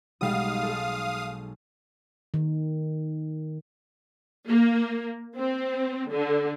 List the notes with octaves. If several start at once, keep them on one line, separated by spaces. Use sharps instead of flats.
B1 G3 G#3 F5 D#6
G#4 A4
D#3
A#3
C4
D3